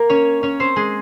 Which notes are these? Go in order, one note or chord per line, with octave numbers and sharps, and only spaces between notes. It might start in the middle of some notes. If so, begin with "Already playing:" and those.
Already playing: A#3 A#4
C#4 C#5
C#4 C#5
C4 C5
G#3 G#4